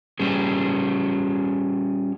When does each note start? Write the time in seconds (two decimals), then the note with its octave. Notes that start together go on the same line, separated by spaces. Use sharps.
0.19 G3 C#4 G#4